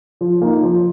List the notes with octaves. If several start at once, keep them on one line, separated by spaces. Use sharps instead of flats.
F3
A#3 D#4
F3